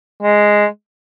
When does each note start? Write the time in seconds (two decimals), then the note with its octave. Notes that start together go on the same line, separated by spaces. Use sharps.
0.23 G#3